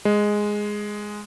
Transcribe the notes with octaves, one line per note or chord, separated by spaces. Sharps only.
G#3